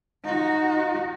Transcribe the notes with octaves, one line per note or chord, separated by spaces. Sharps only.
D#4 F#4